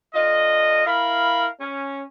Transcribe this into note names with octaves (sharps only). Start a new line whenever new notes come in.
D3 F4 D#5
E4 A#4 F5 B5
C#4